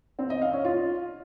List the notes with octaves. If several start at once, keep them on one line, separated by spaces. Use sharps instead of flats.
C4
D#5
F5
C#4
F4